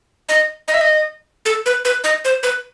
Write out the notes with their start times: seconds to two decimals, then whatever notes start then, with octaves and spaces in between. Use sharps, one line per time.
0.29 D#5
0.68 D#5
0.74 E5
0.81 D#5
1.46 A4
1.66 B4
1.85 B4
2.04 D#5
2.25 C5
2.43 B4